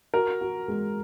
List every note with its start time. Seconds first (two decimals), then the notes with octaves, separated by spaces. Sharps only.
0.14 F#4 A#4
0.41 F#4
0.68 G#3